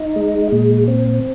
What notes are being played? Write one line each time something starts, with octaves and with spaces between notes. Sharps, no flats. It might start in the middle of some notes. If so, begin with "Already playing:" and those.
Already playing: D#4
G#3
A#2
C4